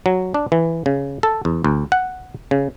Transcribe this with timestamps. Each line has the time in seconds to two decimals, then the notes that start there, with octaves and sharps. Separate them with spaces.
0.06 F#3
0.34 D4
0.52 E3
0.86 C#3
1.23 A4
1.45 E2
1.64 D2
1.92 F#5
2.51 C#3